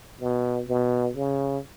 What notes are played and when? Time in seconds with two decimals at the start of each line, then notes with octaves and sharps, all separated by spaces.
0.21 B2
0.68 B2
1.16 C#3